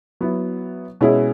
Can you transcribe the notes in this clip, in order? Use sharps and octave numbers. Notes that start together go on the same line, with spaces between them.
F#3 B3 E4
B2 G#3 C#4 E4 G#4